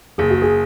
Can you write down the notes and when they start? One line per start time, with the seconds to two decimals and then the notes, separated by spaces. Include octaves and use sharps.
0.18 F#1 G#4
0.30 F#4
0.42 G#4